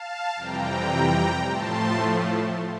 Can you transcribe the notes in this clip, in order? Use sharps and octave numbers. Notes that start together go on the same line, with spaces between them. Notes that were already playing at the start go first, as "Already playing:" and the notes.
Already playing: F5 A5
F2 C3 E3 G3 G5 A#5
A2 F3 A3 A5 C6